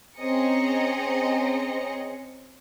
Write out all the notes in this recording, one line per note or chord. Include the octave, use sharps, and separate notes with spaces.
C4 C#4 G#4 D#5 A#5 C#7